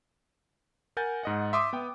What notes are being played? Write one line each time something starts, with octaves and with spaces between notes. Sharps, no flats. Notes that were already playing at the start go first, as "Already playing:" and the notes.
A#4 F#5 G#5 G6 A6
G#2 D#5 F#5
E5 C6 D6 D#6
B3 G5